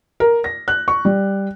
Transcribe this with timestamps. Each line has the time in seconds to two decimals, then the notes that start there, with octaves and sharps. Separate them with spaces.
0.20 A#4
0.44 A#6
0.68 F#6
0.88 C#6
1.05 G3